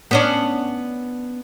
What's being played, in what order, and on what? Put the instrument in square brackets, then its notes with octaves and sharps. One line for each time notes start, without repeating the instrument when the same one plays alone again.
[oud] B3 C#4 D4